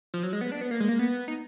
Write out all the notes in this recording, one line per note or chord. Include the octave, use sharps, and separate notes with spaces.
F3
F#3
G#3
B3
D4
B3
A#3
G#3
A#3
B3
D#4